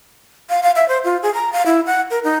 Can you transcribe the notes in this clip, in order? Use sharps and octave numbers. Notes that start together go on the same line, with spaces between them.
F5
F5
E5
C5
F4
G#4
A#5
F5
E4
F#5
A#4
D#4